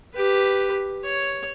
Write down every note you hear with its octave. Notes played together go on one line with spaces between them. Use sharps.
G4 B4
C#5